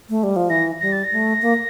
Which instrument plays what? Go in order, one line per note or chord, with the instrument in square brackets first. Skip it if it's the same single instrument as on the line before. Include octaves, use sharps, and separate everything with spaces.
[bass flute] A3
G3
F3
[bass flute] E3 [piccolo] A#6
[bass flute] G3 [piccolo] A#6
[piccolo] A6
A#6
[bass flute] A3
A#3